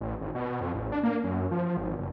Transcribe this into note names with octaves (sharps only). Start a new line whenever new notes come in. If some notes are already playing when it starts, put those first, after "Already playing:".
A1
G#1
B2
F2
A1
D4
A#3
F#2
F3
G#1
F#1